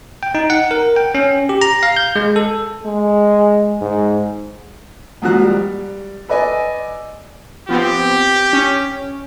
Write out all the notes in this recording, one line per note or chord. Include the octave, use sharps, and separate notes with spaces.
G5
D#4
F#5
A#4
G5
C#4
G4
A#5
F5
G6
G#3
A4
G#3
G#2
D#2 G#2 F3 F#3 F#4 F#6
G3
A4 B4 D5 D#5 G#5
F3 B3 C4 G4
C#4